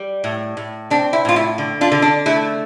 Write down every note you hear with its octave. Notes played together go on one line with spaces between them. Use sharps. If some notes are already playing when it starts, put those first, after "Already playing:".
Already playing: G3
A2
A2
C4 D4
E4
A2 F4
E4
D3
D4 F4
D3
D4
A3 E4